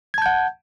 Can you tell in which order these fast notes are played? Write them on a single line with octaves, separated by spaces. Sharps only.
G#6 A5 G6 F#5